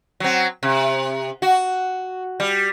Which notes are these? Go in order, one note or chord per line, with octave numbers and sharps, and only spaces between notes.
F#3 C4
C3
F#4
G3